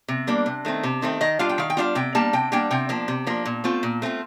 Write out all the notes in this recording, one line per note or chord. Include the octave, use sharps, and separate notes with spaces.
C3
G3 A#3 D4
C3
D#3 A3 C4
C3
D#3 A3 C4
D#3 D#5
G3 D4 F4 F5
G5
D#3 F5
G5
G3 D4 F4 F5
C3 G5
G3 A#3 D4 A5
C3 G5
G3 A#3 D4 G5
C3 G5
F3 A#3 D4
C3
F3 A#3 D4
A#2
A3 C4 F4
A#2
A3 C4 F4